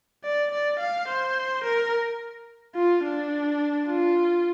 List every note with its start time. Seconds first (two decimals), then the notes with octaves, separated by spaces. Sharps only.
0.24 D5
0.51 D5
0.79 F5
1.08 C5
1.64 A#4
2.75 F4
3.04 D4
3.87 F4